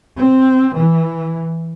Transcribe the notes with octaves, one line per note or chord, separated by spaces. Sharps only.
C4
E3